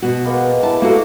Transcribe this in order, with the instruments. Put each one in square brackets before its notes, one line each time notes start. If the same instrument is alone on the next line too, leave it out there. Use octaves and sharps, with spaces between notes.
[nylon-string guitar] B2 F#4
[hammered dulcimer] G#3 A#3 B3
[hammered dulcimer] E4 B4 A#5 [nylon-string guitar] A5
[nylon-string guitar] A#3 F#4 A4